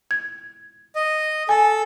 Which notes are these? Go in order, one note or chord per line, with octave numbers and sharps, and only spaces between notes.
G#6
D#5
A4 G#5